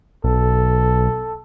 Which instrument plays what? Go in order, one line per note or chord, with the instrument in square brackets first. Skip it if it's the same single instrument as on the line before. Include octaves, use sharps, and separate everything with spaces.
[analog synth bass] B1 [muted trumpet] A4